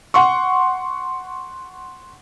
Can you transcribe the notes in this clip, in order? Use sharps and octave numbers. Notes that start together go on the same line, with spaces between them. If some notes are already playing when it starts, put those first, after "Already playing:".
F#5 C6 C#6